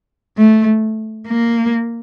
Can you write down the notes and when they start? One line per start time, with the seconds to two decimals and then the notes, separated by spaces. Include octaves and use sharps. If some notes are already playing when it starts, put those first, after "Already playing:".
0.37 A3
1.27 A#3